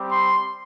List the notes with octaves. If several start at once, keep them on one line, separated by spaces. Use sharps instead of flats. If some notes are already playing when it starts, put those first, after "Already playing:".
Already playing: G3 C4 G4
C6